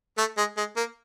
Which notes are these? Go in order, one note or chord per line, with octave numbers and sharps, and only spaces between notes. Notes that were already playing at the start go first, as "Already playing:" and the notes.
A3
G#3
G#3
A#3